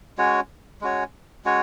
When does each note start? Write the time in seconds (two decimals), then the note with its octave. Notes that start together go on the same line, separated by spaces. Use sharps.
0.18 G#3 C#4 F#4 C#5
0.81 G#3 C#4 F#4 C#5
1.45 G#3 C#4 F#4 C#5